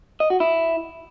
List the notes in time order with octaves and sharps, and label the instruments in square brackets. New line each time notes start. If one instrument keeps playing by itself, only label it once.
[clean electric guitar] D#5
F#4
E4